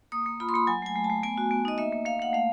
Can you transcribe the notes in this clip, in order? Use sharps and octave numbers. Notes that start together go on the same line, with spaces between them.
A#3 D#6
A#3
F4 B5
C6
A#3 B5
F#3 G#5
A3 G#5
A3
A5
A3
B3 G#5
F#4
B3
D#4 D#5
A#3 E5
A#3
A#3 F5
A#3 F#5
A3 F5